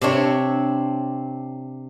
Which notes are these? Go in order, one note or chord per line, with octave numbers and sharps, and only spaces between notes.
C3 C4 D4 C#5